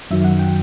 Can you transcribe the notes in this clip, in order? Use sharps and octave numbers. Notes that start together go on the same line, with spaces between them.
F#2 D#3 F#3 E5
F#5
G5